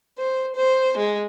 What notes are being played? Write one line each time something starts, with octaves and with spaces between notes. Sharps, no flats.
C5
C5
G#3